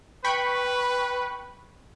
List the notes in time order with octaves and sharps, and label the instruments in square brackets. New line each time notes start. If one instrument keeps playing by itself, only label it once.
[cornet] B4 [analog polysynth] G5 B5 C#6